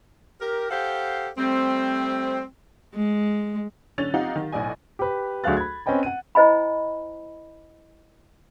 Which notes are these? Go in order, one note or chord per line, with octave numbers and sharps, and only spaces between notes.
G4 A#4
G4 A4 C5 F5 F#5
G3 A3 C4
G#3
D3 C#4 A6 F7
C4 D#4 F4 G4 F5 F#5
D#3
B1 A2 D5 D#5 G#5
G4 B4
D2 F#3 G#4 F5 F#6 A6
B5 G#6
C4 C#4 B4 D#5 G5 B5
F#5 D#7
E4 C5 D#5 G#5 B5